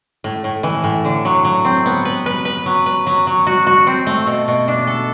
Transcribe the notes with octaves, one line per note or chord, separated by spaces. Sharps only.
A2
A2
E3
A2
D3
F#3
F#3
C4
B3
B4
B4
B4
F#3
B4
F#3
F#3
F#4
F#4
C4
A3
B2
B2
D4
A4